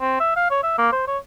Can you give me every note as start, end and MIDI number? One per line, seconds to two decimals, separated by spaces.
0.01 0.20 60
0.20 0.33 76
0.36 0.46 77
0.50 0.59 73
0.63 0.78 76
0.78 0.89 58
0.92 1.04 72
1.07 1.18 73